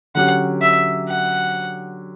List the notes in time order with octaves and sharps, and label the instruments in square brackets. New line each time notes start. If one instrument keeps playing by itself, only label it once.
[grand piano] D3 F#3 C#4 G4 [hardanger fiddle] F#5
[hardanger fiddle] E5
F#5